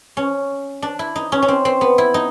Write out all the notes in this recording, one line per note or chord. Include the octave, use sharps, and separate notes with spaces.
C#4
D4
E4
D#4
C#4
C#4
C4
C4
B3
E4
D#4